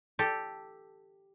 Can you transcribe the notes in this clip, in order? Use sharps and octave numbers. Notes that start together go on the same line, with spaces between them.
G4 A4